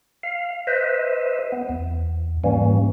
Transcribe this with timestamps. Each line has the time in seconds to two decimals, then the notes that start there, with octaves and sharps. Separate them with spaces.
0.23 F5
0.67 B4 C5 D#5 E5
1.52 B3
1.69 E2
2.44 G#2 E3 G3 A#3 C#4